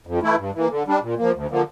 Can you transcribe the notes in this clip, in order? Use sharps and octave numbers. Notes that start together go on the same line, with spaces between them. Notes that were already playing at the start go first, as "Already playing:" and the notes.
F2
E3 A3 E4
G2
E3 A#3
D3
G3 D4
A#2
F3 A#3
D2
D3 F3 A#3